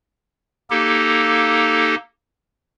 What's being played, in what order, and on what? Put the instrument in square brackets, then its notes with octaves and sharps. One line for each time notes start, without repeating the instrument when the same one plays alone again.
[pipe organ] A#3 D#4 G4 A4